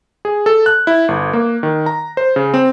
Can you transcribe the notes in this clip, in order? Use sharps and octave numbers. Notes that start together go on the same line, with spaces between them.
G#4
A4
F#6
E4
G1
A#3
D#3
A#5
C5
C#3
C4